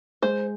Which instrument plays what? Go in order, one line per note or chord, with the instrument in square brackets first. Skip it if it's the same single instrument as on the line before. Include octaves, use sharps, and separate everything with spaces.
[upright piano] G#3 [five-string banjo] C5